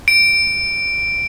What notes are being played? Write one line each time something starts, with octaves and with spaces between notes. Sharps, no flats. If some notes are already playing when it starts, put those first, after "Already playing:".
D7